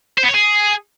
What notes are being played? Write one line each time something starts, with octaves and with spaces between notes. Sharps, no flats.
C5
B3
C#5
G#4